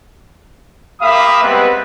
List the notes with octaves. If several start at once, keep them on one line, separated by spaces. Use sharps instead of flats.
A#3 G4 E5 F5 B5 D#6
G3 G#3 B3 C4 B4